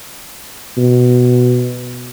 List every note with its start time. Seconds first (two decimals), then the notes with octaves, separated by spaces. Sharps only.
0.78 B2